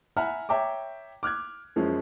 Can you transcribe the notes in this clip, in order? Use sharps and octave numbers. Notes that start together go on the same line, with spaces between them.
E5 F#5 G#5 A#5 B5 F6
C#5 E5 G5 A#5 D6
D6 F6 F#6 G#6
F#2 F3 G#3 C#4